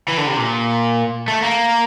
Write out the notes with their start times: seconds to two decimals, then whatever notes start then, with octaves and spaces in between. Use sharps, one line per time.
0.08 E3
0.18 D3
0.27 C3
0.37 A#2
1.28 A3
1.43 A#3